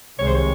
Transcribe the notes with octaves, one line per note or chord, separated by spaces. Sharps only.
C2 C3 D#3 G#3 C#5
C5
C#5